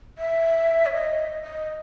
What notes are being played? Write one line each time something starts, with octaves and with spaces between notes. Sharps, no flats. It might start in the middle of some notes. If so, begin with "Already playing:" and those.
E5
C#5
D#5
D#5